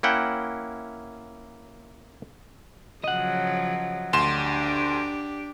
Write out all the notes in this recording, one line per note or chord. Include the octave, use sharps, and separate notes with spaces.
A#3 C#4 E4 F#5 G5
C#3 F3 F#3 D#5 F#5
D2 D4 G4 C6 E7